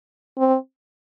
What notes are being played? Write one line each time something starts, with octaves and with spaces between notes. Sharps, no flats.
C4